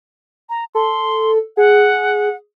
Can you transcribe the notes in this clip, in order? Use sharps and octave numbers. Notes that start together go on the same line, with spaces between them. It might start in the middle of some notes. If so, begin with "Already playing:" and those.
A#5
A4 C6
G#4 F#5